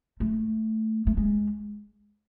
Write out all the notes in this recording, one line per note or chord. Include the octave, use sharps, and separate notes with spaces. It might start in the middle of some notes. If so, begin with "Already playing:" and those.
A3
A3
G#3